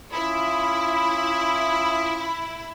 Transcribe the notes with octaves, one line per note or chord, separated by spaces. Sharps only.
C#4 E4 F4 D#6